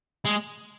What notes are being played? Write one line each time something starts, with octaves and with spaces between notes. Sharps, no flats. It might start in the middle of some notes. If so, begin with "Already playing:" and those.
G#3